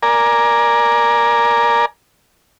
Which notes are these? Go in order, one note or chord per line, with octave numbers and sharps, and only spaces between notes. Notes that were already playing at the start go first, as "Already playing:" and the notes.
A#4 D5 G#5 A#5